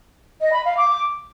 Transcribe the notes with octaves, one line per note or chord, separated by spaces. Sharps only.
D#5
B5
F5
D6